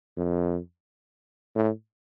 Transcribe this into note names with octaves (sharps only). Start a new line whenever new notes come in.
F2
A2